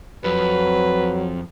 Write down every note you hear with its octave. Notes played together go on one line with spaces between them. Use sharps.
F2 F#3 B4